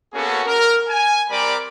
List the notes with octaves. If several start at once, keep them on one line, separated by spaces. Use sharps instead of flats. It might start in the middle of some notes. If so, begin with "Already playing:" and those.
A#3 B3 C#4 F#4 G#4 A4
A#4
G#5
G3 C4 A#4 D5 B5 D6